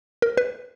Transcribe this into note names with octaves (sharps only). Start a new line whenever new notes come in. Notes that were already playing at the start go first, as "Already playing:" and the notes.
A#4
B4